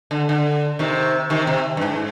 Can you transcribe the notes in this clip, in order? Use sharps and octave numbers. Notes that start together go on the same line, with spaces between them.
D3
D3
C3 D#3
C3 D#3
C3
G2
G#2